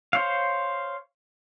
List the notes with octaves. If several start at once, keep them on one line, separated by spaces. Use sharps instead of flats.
C5 C#5 F5